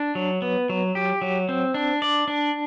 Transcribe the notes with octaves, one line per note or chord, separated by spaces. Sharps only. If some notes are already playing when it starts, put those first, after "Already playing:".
Already playing: D4
F#3
B3
F#3
G4
F#3
C4
D4
D5
D4